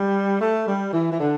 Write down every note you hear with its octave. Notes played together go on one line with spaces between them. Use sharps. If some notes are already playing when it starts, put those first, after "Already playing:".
Already playing: G3
A3
G3
E3
E3
D3